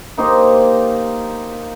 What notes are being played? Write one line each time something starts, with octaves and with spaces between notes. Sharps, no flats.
A#3 D#4 G4 C5